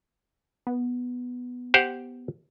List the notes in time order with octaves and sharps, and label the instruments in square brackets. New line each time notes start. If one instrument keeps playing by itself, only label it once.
[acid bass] B3
[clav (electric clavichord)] G4 C5 F#5